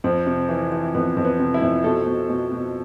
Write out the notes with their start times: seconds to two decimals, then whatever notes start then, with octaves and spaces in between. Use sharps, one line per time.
0.04 F2 C4
0.27 C3
0.49 E3
0.72 E3
0.94 F2 B3
1.17 F2
1.25 B3
1.40 C3
1.54 E4
1.62 F2
1.84 B2 A4
2.07 B2
2.30 B2
2.52 B2